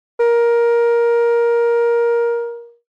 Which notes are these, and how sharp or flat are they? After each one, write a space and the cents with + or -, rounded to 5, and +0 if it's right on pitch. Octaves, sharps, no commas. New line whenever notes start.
A#4 +15